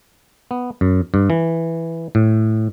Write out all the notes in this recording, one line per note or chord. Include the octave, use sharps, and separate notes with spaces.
B3
F#2
G2
E3
A2